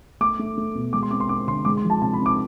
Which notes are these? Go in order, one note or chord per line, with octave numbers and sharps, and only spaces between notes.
A3 D6
A3
A3
B2
G#3 D6
C6
C4 D6
C6
C4 D6
D3 C6
G#3 D6
C6
F3
A5
C3 A5
B5
C4
D6